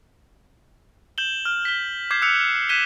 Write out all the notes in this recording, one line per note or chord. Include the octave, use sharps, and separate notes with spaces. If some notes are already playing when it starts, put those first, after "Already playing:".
G6 E7 F#7 G7
F6
B6 G7
D6 G6 G#6 C7
E6 F#6 C#7 F7
F#6 G#6 B6 D#7 E7 G7